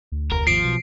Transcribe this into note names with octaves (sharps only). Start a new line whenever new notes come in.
D2
F1 A#4
G#1 D#2 F3 C7 D7
B1 B2